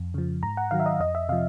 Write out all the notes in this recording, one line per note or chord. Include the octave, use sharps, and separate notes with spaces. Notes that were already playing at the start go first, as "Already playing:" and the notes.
Already playing: F2
C#3 F3
G#2 A#5
F#5
D#3 F#3 F5
E5
D#5
F2 D#5
E5
C3 F3 F5